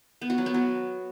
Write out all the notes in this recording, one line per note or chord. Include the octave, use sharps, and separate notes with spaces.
B3
F#4
F#3
B3
F#3